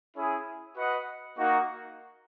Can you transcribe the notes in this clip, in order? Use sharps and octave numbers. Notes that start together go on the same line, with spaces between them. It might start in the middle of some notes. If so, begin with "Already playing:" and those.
C#4 E4 G#4
F#4 B4 D#5 F#5
A#3 D#4 F#4